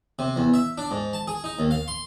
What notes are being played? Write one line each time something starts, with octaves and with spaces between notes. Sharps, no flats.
C3
E2
E5
D4
G#2
A5
G#4
D#4
D#2
F5
C6